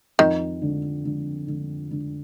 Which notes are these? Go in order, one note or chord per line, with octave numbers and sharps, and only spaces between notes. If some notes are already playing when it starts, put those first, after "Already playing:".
F2 D#3
D3
D3
D3
D3